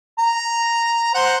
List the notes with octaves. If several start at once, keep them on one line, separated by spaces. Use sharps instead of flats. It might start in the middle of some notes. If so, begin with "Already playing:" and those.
A#5
C5 F#5